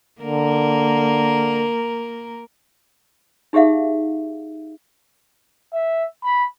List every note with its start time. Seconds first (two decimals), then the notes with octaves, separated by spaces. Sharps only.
0.21 D3 A#3 A#4
3.53 D#4 G4 G#4 E5 F5
5.73 E5
6.24 B5